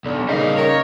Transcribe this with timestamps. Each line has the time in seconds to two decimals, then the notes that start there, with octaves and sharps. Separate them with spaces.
0.06 B1 D3
0.29 C#3 G3 A#3 D#4 F5
0.58 A#4 C#5